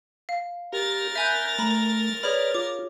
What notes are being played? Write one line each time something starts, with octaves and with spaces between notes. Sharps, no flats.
F5
G4 A#4 A6
E5 G#5 B5 F#6 G6
A3 A#5 B5
G#4 B4 C#5 D5 B5 F6
F4 D6